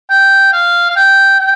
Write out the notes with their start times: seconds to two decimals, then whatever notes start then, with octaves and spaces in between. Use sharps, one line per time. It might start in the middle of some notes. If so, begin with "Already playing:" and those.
0.10 G5
0.53 F5
0.89 F5
0.96 G5
1.40 G5